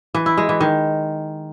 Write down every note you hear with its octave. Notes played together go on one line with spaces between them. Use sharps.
E3
E4
G#3
E3
D#3